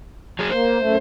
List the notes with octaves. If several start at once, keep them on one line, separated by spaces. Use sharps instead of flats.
F#3 G#4
A#3 C5
F#2 A3